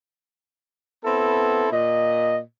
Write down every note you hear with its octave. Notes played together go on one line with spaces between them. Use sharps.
B3 C4 E4 A4
A#2 D#5